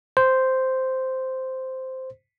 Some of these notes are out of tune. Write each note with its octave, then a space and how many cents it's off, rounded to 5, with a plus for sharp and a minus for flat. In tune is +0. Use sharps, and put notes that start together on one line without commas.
C5 -5